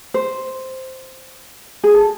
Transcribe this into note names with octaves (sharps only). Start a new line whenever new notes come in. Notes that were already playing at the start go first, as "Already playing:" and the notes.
C5
G#4
A4